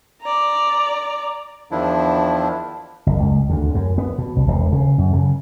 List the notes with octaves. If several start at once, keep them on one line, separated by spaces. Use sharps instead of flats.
D5 A#5
E2 D#3 F3 D4 E4
F#1
C#2
D2
F#2
B3
B2
C2
E1
C#3
F#2
C#3